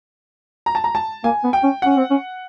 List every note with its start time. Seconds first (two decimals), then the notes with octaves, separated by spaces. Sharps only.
0.66 A#5
0.75 A5
0.84 A#5
0.95 A5
1.24 A#3 G#5
1.44 B3
1.53 G5
1.63 C#4
1.82 C#4 F#5
1.97 C4
2.11 C#4